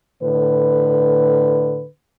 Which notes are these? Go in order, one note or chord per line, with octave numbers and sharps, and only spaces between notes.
A2 D3 B4